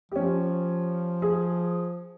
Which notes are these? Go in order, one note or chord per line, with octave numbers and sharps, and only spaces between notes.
F3 C#4 G4
G#4